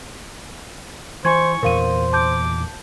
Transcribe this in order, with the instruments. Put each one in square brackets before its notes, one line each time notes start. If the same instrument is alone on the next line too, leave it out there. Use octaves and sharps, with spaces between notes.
[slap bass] E3 [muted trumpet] C5 [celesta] G#5 G#6 [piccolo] C#6
[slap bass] E2 A#2 [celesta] A#4 F5 D#7 [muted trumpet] C5
[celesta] A5 G6 [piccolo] D6